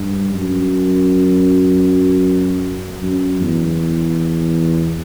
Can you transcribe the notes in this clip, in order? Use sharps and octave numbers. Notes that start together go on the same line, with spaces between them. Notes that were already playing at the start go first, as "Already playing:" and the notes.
Already playing: G2
F#2
F#2
E2